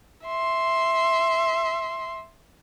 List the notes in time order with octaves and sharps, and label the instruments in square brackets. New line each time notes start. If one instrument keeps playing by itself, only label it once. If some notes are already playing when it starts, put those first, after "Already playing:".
[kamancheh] E5 C6